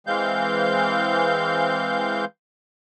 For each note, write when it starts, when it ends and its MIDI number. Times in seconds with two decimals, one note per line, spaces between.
0.07 2.25 52
0.07 2.25 56
0.07 2.25 60
0.07 2.25 77
0.07 2.25 91